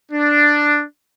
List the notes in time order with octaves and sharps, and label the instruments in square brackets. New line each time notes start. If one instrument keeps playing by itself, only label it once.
[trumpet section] D4